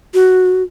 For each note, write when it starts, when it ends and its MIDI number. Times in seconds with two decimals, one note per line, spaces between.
0.14 0.63 66